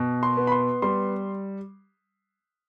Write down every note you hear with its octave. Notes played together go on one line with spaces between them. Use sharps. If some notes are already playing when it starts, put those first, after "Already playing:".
Already playing: B2
C6
B3
B5
C6
G3 C6